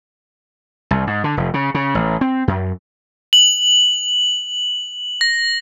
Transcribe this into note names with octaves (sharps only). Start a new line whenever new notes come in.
C2
G#2
D3
F1
C#3
C#3
A1
C4
F#2
F#7
A#6